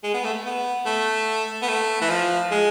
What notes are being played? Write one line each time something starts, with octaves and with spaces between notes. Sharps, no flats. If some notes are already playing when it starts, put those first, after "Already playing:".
G#3
B3
A3
B3
A3
B3
A3
E3
F3
G#3